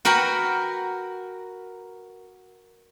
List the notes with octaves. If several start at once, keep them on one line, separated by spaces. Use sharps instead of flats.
F#4 A#4 B4 F#5 G5